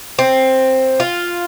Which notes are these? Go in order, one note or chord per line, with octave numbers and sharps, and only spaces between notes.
C4
F4